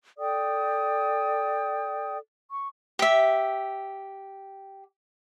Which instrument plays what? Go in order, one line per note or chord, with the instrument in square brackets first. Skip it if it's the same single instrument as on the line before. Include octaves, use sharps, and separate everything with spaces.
[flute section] A4 D5 G5 D#6
C#6
[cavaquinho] G4 E5